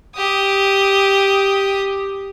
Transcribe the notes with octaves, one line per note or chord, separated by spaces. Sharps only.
G4 D#6